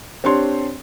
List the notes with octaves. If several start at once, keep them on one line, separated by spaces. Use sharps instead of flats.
C4 D4 G4 C#5 C6